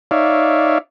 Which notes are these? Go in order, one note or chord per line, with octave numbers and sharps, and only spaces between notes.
D#4 C#5 D5 E5 F5